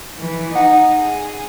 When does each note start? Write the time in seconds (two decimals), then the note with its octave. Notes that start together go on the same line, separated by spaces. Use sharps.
0.19 E3
0.55 D#4 F#5
0.96 G#4